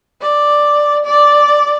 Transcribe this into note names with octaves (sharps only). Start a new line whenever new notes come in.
D5
D5